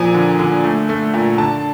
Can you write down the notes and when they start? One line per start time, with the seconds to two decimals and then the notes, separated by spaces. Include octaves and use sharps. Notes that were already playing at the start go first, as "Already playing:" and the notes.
Already playing: A#2 F3 G#5
0.14 D3
0.39 D3
0.64 A3
0.89 A3
1.14 A#2
1.38 D3 A5